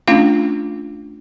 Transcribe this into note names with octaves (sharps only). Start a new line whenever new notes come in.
A3 C#4 D4 F4 F5